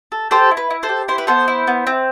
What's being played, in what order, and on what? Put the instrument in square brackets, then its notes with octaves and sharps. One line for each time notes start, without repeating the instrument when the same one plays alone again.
[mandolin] A4
G4 A4 C5
E4
B4
E4
A4 C5
G4
E4 C5
B4
B3 A4 C5
E4
B3
C4